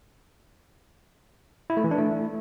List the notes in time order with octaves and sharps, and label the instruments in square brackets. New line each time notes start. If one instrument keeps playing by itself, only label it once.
[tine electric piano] E4
A3
E3
D4
A3